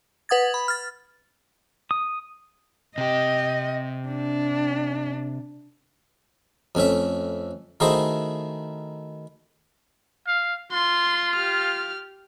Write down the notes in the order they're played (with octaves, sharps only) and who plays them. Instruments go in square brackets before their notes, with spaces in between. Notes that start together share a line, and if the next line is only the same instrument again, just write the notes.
[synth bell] B4 F#5 D#6 G#6 A6
B5
F6 A6
[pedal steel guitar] D#6
[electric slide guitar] C3 G4 [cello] D#5
[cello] D4
[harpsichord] F2 A3 C#4 E5
D#3 A3 E4 F#4 G#4 C5
[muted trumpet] F5
[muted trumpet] F4 [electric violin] C6
[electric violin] G4 F6